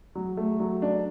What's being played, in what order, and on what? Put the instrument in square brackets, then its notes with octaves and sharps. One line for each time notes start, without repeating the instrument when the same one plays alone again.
[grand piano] F#3
A3
F#3
D4